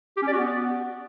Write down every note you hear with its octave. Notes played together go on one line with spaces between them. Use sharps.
G4
C#4
D5
F#4
B3